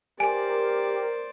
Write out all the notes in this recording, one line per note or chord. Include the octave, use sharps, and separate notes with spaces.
G4 A#4 C5 D5 G#5